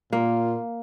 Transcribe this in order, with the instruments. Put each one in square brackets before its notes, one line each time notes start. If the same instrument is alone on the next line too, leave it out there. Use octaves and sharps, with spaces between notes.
[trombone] A#2 [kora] A#3 [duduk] F4